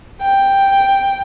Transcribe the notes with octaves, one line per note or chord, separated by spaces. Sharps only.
G5